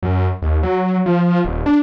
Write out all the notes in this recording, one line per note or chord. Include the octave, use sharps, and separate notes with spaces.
F#2
D#2
F#3
F3
D#1
D4